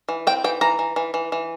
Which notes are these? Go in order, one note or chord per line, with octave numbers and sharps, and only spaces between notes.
E3
C4 G5
E3 G5
E3 A#5
E3
E3
E3
E3